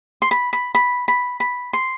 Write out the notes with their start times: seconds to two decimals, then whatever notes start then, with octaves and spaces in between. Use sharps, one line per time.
0.22 C6
0.31 B5
0.53 B5
0.75 B5
1.08 B5
1.40 B5
1.73 C6